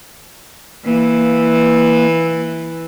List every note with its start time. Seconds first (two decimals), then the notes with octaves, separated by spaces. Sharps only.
0.85 E3 A#3